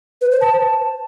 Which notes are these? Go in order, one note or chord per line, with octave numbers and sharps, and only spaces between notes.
B4
C5
A5